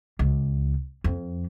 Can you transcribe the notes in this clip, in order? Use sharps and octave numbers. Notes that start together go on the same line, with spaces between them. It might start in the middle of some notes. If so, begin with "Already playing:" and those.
C#2
F2